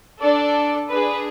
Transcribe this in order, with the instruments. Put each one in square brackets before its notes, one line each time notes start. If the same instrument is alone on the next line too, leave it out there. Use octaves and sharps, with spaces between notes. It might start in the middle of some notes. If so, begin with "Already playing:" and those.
[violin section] D4 A4 D5
D4 G#4 B4